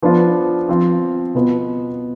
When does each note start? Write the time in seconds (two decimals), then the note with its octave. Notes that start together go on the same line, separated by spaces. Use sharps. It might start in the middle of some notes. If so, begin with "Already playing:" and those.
0.03 F3 B3 D4 F4
0.69 F3 C4 F4
1.35 B2 B3 F4